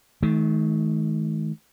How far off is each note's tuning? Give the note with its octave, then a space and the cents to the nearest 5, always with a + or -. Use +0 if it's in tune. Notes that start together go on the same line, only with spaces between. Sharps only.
D#3 +35 A3 -40